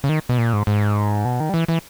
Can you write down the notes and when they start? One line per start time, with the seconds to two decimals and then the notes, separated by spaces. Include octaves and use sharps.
0.04 C#3
0.09 D#3
0.29 B2
0.38 A#2
0.53 G#2
0.67 G#2
1.25 B2
1.40 D#3
1.49 G3
1.54 E3
1.68 E3